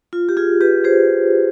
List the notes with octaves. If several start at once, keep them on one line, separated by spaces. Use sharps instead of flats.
F4
G4
F4 G#4
G4 B4
G#4 C5